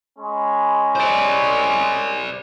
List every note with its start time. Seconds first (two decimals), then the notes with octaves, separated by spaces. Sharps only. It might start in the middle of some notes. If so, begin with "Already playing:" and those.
0.19 G#3 C#4 B5
0.96 C5 D5